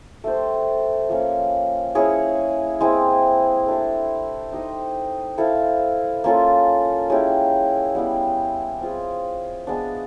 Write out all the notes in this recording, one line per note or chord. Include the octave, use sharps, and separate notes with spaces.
A3 D4 G4 C5
F3 A#3 C#4
C#4 E4 G#4 C#5
G#3 C4 E4
A3 D4 G4
D#4 G4 C5 D#5
E4 A4 C5 F5
A#3 C#4 F4 A4
G#3 C#4 E4 G4
G3 B3 E4 G4
C4 F4 G#4
G#3 B3 D4